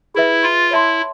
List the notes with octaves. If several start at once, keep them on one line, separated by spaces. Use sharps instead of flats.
E4 G#4 B4 E5
F4
E4 C#5 E5 A5 C6